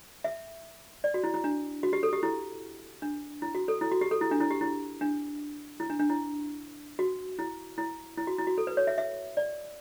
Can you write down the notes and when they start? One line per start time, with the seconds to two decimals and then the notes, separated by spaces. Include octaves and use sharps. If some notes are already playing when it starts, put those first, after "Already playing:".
0.24 E5
1.04 D5
1.14 F#4
1.24 E4
1.34 E4
1.44 D4
1.83 F#4
1.93 G4
2.03 A4
2.13 G4
2.23 E4
3.02 D4
3.42 E4
3.55 F#4
3.68 A4
3.81 E4
3.92 F#4
4.01 G4
4.11 A4
4.21 E4
4.31 D4
4.40 E4
4.50 G4
4.61 E4
5.01 D4
5.80 E4
5.90 D4
6.00 D4
6.10 E4
6.99 F#4
7.39 E4
7.78 E4
8.18 E4
8.27 F#4
8.38 E4
8.47 F#4
8.58 A4
8.67 B4
8.77 C#5
8.87 E5
8.98 E5
9.37 D5